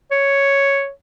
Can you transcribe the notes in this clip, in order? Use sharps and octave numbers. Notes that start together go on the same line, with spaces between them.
C#5